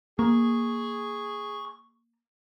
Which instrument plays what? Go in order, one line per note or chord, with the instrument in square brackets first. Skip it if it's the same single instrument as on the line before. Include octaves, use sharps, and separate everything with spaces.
[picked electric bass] A#3 [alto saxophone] G#4 [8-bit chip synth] C#6